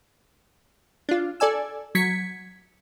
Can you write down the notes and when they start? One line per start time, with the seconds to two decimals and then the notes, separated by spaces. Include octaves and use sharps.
1.09 D4 F4
1.40 A4 D5 G#5 E6
1.95 F#3 G#6 B6 C#7